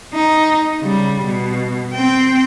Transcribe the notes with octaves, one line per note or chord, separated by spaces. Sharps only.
D#4
C#3 G3
B2
C4 G5